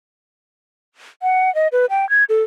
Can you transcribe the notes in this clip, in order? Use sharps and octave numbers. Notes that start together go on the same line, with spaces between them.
F#5
D#5
B4
G5
G#6
A4